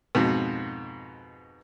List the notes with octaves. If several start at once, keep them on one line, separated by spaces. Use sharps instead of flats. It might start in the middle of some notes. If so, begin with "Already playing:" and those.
F2 G#2 B2